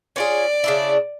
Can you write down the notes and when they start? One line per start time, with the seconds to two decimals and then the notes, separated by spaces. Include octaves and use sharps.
0.16 C#4 F4 G#4 D5
0.64 C#3 D4 E4